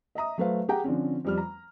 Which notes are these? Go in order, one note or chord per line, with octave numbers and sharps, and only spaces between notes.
D#5 E5 A#5 D#6
F#3 A3 B4 C5 F5
G4 G#4 F#5 G5 A#5
D3 F3 C4 C#4
F2 G3 F6
A#5